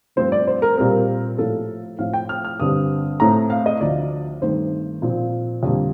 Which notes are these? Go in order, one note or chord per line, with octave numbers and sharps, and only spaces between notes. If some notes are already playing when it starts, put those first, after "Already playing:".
G2 F3 A3 C4 C5
D5
C5
A#4
A#2 G3 C4 A#4
A2 F3 A#3 A4
A2 F3 C4 F5
G5
F6
F6
G2 D3 G3 C4 D#6
A2 A3 C4 A#5
F5
D#5
D2 D3 F3 D5
G2 D#3 A3 C4 C5
A#2 F3 C4
F2 D3 G3 A#3